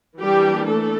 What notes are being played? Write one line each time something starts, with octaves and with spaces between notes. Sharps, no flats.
E3 G3 A#3 D4 G4
A3 A4